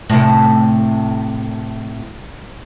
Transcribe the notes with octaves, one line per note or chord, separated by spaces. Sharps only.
A2 C3